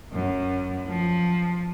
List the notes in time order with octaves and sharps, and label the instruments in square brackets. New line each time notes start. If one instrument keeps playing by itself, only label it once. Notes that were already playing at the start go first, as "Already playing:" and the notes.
[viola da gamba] F#2
F3